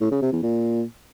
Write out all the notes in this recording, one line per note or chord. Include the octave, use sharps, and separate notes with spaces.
A2
C#3
C3
E2
A#2